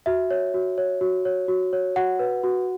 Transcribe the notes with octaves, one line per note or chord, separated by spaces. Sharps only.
F#4 E5
C#5
F#4
C#5
F#4
C#5
F#4
C#5
F#4 F#5
B4
F#4